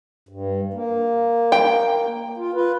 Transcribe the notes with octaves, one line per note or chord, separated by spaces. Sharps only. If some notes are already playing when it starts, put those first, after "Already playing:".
G2
A#3
G5
F4
F4 B4